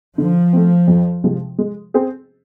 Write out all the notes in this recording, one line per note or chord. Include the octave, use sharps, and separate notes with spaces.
D3 F3
A3 C4
F2
C3 F3 G#3
G#3
C4 G#4